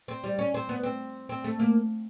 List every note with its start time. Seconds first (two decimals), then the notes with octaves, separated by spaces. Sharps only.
0.08 C4
0.24 G3
0.39 C#4
0.54 C4
0.69 B3
0.83 C4
1.29 C4
1.44 A3
1.60 A#3